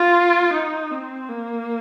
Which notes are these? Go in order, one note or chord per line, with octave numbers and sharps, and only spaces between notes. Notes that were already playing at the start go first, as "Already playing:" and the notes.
Already playing: F4
D#4
C4
A#3